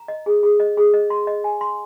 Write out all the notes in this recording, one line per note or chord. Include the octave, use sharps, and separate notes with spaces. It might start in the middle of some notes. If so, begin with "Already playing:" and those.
Already playing: A#5
D#5
G#4
G#4
D#5
G#4
D#5
C6
D#5
G#5
C6